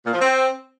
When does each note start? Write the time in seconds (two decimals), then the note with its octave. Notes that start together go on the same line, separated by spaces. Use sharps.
0.05 A#2
0.13 F3
0.21 C4